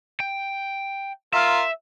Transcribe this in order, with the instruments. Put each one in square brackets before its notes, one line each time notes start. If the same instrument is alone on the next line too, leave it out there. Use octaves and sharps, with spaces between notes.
[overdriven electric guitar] G5
[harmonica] F4 A#4 [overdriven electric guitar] E5